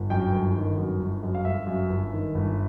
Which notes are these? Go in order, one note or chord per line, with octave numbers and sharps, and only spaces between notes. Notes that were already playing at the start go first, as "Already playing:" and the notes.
Already playing: G1
F#2 G5
G1
D#3
F#2
G1
F#2
F5
G1 E5
F#2
G1
D#3
G1